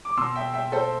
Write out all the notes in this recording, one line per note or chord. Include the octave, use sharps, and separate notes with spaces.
D6
B2 C6 E6
E5 G5
E5 G5
A4 C5